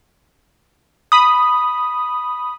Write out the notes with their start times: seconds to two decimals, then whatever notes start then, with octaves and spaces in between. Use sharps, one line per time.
1.12 B5 D#6